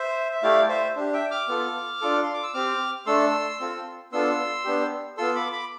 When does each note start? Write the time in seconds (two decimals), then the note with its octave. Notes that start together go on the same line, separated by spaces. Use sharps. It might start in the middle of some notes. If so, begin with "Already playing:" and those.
Already playing: C5 E5
0.31 E5
0.43 A3 E4 G4 D5 F5
0.69 C5 E5
0.96 D4 G4
1.13 E5 G5
1.31 D6 F6
1.48 B3 F4 A4
2.01 D4 F4 A4
2.23 C6
2.34 D6
2.43 E6
2.54 C4 G4 D6 F6
3.06 A3 D4 A4 C6 E6
3.60 C4 F4 A4
4.12 B3 D4 F4 A4 C6 E6
4.64 B3 D4 G4
5.17 B3 F4 A4 C6 E6
5.35 B5 D6
5.52 B5 D6